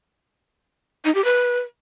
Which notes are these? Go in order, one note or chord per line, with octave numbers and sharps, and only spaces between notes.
D#4
G4
B4